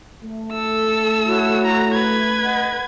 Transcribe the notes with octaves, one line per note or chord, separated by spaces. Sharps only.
A3
A4 E6
E4 F#4 C#5
A#5
B4 G#6
D#5 F#5